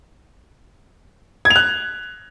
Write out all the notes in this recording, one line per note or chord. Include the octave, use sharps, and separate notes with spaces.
G#6
F7
F#6